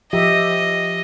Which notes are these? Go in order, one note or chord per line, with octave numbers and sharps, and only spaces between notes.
F3 G4 D#5 E5